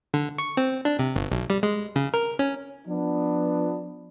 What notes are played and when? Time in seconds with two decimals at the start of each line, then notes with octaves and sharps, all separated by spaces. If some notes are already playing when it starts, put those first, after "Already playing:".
0.14 D3
0.38 C#6
0.57 C4
0.85 D4
0.99 C3
1.16 G1
1.32 B1
1.50 G3
1.63 G#3
1.96 C#3
2.14 A#4
2.39 C#4
2.87 F3 B3 D4